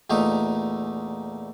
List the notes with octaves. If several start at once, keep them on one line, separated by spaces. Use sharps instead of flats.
E2 A#2 A3 D#4